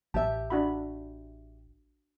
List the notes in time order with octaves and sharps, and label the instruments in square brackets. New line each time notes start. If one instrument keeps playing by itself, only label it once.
[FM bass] A1 [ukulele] G4 E5 [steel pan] A5
[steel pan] D4 F#4 B5